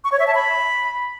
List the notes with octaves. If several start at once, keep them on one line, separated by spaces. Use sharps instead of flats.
C#6
C#5
E5
A5
B5